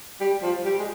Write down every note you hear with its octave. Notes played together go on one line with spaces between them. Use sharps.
G3
F3
G3
G#3